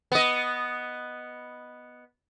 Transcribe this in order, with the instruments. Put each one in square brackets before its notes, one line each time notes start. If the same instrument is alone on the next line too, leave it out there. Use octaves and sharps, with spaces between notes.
[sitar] B3 D#5